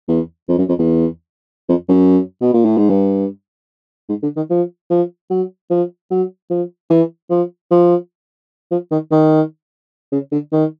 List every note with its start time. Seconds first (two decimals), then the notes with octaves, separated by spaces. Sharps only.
0.08 E2
0.48 F2
0.58 F#2
0.68 F2
0.79 E2
1.69 F2
1.88 F#2
2.41 B2
2.53 A#2
2.65 A2
2.77 G#2
2.89 G2
4.09 G#2
4.23 D3
4.36 D#3
4.50 F3
4.90 F3
5.30 F#3
5.70 F3
6.11 F#3
6.50 F3
6.90 E3
7.30 F3
7.71 F3
8.71 F3
8.91 D#3
9.11 D#3
10.12 C#3
10.32 D3
10.52 D#3